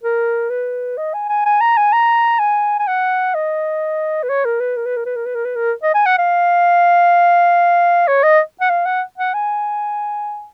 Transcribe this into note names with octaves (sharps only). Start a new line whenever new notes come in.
A#4
B4
D#5
G#5
G#5
G#5
A#5
G#5
A#5
G#5
G#5
F#5
D#5
B4
C#5
A#4
B4
A#4
B4
A#4
B4
A#4
B4
A#4
B4
A#4
D#5
G#5
F#5
F5
C#5
D#5
F#5
F5
F#5
F#5
G#5